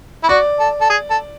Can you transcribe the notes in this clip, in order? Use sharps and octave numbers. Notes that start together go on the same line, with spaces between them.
E4
F#4 D5
A4
A4
G#4
A4